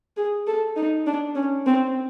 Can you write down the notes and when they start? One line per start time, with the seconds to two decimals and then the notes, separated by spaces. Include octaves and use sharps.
0.17 G#4
0.47 A4
0.76 D#4
1.07 D4
1.36 C#4
1.66 C4